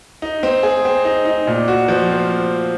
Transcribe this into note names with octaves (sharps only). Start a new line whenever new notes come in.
D#4
C4
G#4
C4
D#4
D#4
A#2
F#4
F3
C4